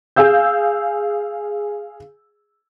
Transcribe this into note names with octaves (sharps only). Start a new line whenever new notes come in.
G#4 F5 E6 G6